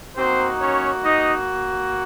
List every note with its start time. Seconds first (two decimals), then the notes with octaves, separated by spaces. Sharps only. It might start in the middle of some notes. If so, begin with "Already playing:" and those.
0.17 A#3 C4 D#4 F#4 C5
0.60 C#4 C#5
1.03 D#4 D#5